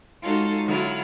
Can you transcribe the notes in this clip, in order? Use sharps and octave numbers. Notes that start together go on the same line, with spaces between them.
G#3 D#4 F4 F#4 A4 C#5
D3 F#3 E4 F4